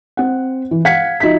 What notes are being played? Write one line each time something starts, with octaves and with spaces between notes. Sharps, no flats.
C4 F#5
E3
F5 F#5 G#6 B6 C#7
F3 D#4 F#4 E5 B6